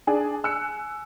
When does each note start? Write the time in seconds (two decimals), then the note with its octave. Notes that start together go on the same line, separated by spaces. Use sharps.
0.07 D4 G#4
0.44 G#5 E6 F#6 C#7